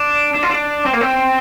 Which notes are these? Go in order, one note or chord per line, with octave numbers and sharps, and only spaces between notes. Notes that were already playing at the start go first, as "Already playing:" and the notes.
Already playing: D4
D4
F4
D4
C4
A#3
C4